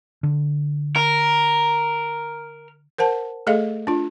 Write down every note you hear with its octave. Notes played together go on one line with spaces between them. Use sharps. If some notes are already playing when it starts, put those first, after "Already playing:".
D3
A#4
A#4 C5 F#5 A5
A3 G#4 A4 D#5 F5
D4 F4